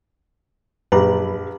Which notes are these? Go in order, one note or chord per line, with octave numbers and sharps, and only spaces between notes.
A#1 F#2 G4 B4 A#5